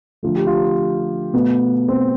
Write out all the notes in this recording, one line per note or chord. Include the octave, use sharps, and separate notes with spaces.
D3 F3 A3 F4
G4
F4
B2 A3 B3
C4